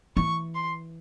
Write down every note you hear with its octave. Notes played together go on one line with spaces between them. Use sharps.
E3 C#6
C6